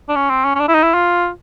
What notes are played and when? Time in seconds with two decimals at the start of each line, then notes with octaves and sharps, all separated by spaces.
0.09 D4
0.16 C#4
0.30 C4
0.44 C#4
0.55 C#4
0.60 D4
0.68 E4
0.75 D#4
0.83 E4
0.94 F4